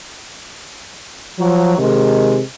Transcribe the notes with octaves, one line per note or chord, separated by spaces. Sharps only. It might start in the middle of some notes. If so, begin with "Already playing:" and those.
F3 F#3
C3 D#3 G#3